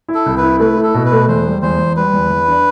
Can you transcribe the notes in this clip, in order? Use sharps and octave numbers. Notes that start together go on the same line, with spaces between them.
E4
A4
C2
B4
E4
A3 B4
E4
A4
B2
B4
A3
E2 C5
G3
E2 C5
E2
G3 B4
E2
E2
D4